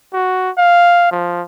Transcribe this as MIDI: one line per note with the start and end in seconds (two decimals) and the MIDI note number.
0.13 0.50 66
0.58 1.08 77
1.11 1.43 53